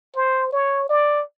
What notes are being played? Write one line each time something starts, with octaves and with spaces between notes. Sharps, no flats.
C5
C#5
D5